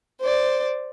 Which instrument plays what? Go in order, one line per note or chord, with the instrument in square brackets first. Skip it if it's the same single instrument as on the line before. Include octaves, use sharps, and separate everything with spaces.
[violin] C5 D5